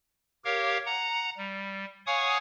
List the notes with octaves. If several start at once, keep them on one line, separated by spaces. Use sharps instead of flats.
G4 A#4 C#5 F5
F#5 A#5
G3
C#5 F5 F#5 G#5 C#6 D#6